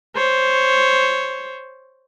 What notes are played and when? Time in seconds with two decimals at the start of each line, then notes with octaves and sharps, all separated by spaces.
0.16 C5 C#5